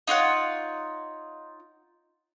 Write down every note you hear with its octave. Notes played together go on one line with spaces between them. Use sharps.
D#4 F4 C#5 F#5